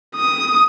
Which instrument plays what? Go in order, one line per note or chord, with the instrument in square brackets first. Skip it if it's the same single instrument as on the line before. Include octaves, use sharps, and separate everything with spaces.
[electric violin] D#6